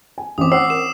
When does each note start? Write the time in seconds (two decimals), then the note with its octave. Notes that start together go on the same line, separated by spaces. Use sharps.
0.18 G#5
0.38 A1 C4 D6 D#6
0.52 C5 F#5 E6 C7
0.70 A#4 E7